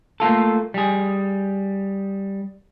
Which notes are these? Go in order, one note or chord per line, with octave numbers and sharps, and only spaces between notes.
A3 A#3 F4 A4
G3 G#4